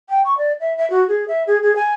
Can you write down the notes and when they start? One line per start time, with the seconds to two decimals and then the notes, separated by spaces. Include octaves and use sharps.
0.09 G5
0.25 C#6
0.38 D5
0.60 E5
0.78 E5
0.90 F#4
1.08 G#4
1.28 E5
1.47 G#4
1.63 G#4
1.76 G#5